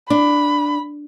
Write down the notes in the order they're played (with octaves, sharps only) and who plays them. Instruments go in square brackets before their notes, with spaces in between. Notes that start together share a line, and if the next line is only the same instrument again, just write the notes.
[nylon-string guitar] D4 [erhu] B5